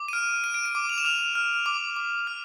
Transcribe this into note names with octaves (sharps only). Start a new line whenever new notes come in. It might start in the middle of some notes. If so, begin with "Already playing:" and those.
Already playing: D6
D#7
F6 D7
F6 D#7
D7
D#7
D6
F7
E7
F6 F7
F6
D6
D6
F6